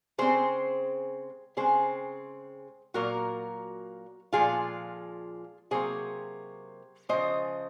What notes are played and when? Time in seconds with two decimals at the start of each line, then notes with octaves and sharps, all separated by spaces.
0.18 C#3 G#3 C4 G#4 C5
1.57 C#3 G#3 C4 G#4 C5
2.94 A#2 F#3 A#3 F#4 A#4
4.33 A#2 F3 G#3 F4 G#4
5.71 C3 F#3 A#3 G#4 C5
7.09 C#3 F3 G#3 C5 D#5